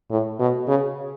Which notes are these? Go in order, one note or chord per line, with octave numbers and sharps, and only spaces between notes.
A2
B2
C#3